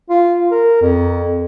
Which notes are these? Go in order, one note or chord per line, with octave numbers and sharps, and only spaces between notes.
F4
A#4
F2